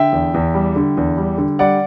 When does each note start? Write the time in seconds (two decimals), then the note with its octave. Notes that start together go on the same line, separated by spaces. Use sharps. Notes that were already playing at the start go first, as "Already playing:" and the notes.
Already playing: D3 E5 G5
0.12 E2
0.34 E2
0.54 G3
0.76 D3
0.97 E2
1.17 G3
1.38 D3
1.59 G3 D5 F#5